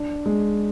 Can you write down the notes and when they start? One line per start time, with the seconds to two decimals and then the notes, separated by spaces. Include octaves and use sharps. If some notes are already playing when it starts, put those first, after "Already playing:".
Already playing: D4
0.26 G#3